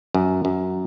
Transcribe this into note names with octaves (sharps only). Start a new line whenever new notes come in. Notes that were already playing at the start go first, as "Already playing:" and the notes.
F#2
F#2